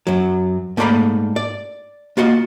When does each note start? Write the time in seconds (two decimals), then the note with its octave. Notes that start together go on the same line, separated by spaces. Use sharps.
0.07 F#2 F#3
0.77 G#2 A3 A#3 D5 A#5 B5
1.36 D5
2.17 A#3 F4 F#4 D#5